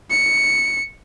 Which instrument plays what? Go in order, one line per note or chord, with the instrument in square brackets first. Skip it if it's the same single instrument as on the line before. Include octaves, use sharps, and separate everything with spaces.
[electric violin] C#7